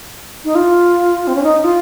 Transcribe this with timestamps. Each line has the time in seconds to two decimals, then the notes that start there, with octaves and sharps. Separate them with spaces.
0.45 D#4
0.55 F4
1.27 C4
1.35 C#4
1.43 D#4
1.64 F4